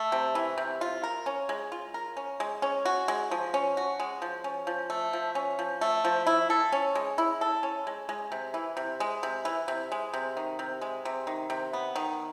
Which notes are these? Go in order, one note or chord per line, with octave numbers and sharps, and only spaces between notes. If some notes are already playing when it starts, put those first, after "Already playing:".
Already playing: A3
C3
E3
C3
F4
A#4
C#4
G#3
F4
A#4
C#4
G#3
C#4
F#4
G#3
F3
C#4
F#4
G#3
F3
C#4
F3
A3
F3
C#4
F3
A3
F3
E4
A4
C#4
G#3
E4
A4
C#4
G#3
G#3
C3
E3
C3
G#3
C3
E3
C3
G#3
C3
D#3
C3
G#3
C3
D#3
C3
B3
D#3